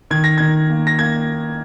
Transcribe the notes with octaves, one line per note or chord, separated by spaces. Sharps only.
D#3 G#6
A#6
D#3 G#6
A#3
A#6
A#3 G#6